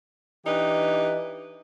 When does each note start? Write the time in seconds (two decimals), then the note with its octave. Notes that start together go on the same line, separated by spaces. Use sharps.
0.45 E3 D4 D#4 G4 B4